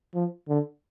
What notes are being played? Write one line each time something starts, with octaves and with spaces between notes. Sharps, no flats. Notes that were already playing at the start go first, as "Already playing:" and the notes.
F3
D3